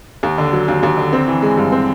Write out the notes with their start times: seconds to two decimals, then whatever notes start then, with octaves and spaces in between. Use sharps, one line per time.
0.23 D#2
0.38 D3
0.53 F#3
0.68 D#2
0.83 D#2
0.98 D3
1.13 C4
1.28 E3
1.42 G#3
1.57 G2
1.72 C4